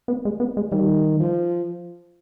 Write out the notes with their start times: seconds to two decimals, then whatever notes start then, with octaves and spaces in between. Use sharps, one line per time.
0.08 B3
0.25 G#3
0.40 B3
0.57 G#3
0.72 D#3 G3
1.20 F3